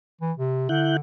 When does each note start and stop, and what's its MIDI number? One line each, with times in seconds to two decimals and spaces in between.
0.21 0.32 52
0.37 0.67 48
0.69 0.99 50
0.69 0.97 64
0.69 0.97 90
0.69 0.97 91